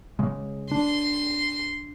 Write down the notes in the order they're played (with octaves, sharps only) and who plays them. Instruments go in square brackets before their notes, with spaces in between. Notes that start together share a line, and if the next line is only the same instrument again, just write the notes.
[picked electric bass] C#3 G#3
[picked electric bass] D4 [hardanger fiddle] C6